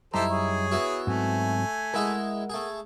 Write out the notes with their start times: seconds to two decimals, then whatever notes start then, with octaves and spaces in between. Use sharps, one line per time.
0.14 F#2 G3 D#4 E4 G4 A4 C5 A#5
0.31 G#4 C#5
0.72 B3 E4 F#4
1.07 G#2 F#3 A3 C4 G#5
1.94 G#3 E4 G#4 A#4 F#5
2.50 A3 G#4